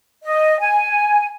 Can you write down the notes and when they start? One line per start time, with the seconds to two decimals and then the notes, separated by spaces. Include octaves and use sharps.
0.24 D#5
0.61 G#5